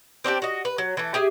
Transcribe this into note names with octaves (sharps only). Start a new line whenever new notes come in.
C4 D4 F#4 G4
F#4 D#5
B4
F#3
E3 A3
G4 G#4 E5